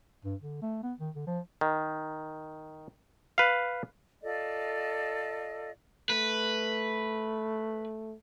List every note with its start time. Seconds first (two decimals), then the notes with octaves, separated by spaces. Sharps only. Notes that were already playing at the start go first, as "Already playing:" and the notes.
0.25 G2
0.42 D3
0.62 A3
0.83 B3
1.00 D#3
1.16 D3
1.27 F3
1.61 D#3
3.38 B4 F5
4.22 F4 A4 D5 D#5
6.10 A3 B4